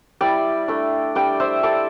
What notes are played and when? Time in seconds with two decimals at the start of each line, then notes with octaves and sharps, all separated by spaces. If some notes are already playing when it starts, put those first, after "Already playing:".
0.21 G3 E4 D5 G5
0.68 A3 D4
1.15 G3 D4 D5 G5
1.40 C5 E5
1.63 G3 D4 A4 D5